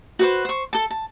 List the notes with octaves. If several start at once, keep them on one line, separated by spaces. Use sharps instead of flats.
F#4 B4 C5
C5 C#6
A4 A5
A5